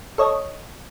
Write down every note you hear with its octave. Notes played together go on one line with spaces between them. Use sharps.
A4 C#5 D#5